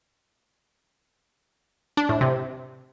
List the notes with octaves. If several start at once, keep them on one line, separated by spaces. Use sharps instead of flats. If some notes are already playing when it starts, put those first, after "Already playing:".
D4
A2
C3